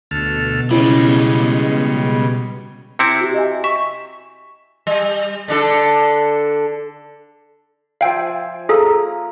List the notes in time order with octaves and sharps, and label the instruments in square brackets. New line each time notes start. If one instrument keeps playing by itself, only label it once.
[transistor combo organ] D2 A4 F6 [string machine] B2
[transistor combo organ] C#3 [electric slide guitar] G3 G#3 [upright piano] C#4 E4
[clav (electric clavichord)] C3 C4 E4 [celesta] C#7
[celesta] F#4 G4
D#5 E5 G#5
[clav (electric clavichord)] E5 [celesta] C#6
[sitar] G3
D3 D4 A4
[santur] F3 E5 G#5 [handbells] F5 G5
[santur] A#3 A#5 [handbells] G#4 A4